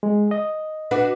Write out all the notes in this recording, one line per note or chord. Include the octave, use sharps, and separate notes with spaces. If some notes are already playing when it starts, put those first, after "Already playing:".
G#3
D#5
D4 F#4 B4